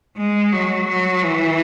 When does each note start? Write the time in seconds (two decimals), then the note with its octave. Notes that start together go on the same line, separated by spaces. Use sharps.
0.17 G#3
0.52 F#3
0.88 F#3
1.24 E3